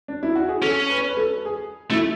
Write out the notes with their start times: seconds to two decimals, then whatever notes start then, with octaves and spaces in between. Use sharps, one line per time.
0.08 D4
0.23 E4
0.35 F#4
0.49 G#4
0.62 C#4 A4
0.89 B4
1.08 B4
1.17 A4
1.45 G#4
1.90 A3 E4